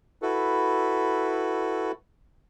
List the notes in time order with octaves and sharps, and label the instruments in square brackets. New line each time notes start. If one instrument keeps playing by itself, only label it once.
[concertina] E4 F#4 A4 B4